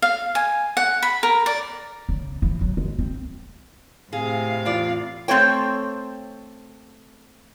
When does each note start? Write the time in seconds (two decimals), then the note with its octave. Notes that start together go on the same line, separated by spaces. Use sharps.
0.02 F5
0.35 G#5
0.77 F#5
1.02 B5
1.23 A#4
1.46 D5
2.09 C#3
2.42 E3
2.61 F#3
2.77 G#3
2.99 C4
4.13 A2 C3 G#4 F5
4.65 E2 F4 D5
5.28 A3 C4 A4 C#5 G5